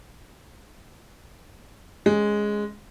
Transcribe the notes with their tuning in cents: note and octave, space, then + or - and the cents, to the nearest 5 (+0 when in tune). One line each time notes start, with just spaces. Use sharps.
G#3 +0 C#4 +0 G#5 -10